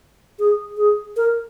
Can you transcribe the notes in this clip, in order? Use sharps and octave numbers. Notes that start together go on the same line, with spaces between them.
G#4
G#4
A#4